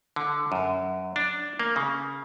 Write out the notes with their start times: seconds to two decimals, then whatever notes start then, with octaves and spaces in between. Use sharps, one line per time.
0.16 D3
0.52 F#2
1.16 D4
1.59 A#3
1.76 C#3